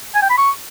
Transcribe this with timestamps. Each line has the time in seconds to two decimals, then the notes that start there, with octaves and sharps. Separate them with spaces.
0.15 G#5
0.22 G5
0.30 B5
0.38 C#6